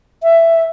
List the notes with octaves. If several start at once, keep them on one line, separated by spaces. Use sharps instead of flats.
E5